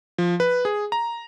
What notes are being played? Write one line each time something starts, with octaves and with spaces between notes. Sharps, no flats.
F3
B4
G#4
A#5